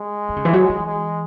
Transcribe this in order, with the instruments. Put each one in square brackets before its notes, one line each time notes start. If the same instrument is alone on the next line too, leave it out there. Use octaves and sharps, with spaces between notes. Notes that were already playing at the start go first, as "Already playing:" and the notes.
Already playing: [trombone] G#3
[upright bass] D#3
C#3
E3
F#3
E3
[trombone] G#3